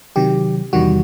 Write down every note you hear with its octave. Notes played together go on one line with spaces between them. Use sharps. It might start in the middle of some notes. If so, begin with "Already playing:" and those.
C3 D#3 F#3 G4
E2 C3 D#3 G3 F#4